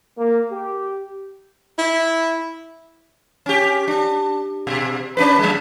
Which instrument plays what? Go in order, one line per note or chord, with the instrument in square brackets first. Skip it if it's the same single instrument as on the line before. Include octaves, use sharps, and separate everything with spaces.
[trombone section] A#3
G4
[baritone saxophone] E4
[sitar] C#4 G4
D4
B2
C#4 D4 B4
F#3 G#3